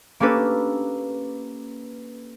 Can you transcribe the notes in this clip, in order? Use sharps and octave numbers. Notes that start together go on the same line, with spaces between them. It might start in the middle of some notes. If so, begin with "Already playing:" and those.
A#3 C#4 D4 G4 A4 B4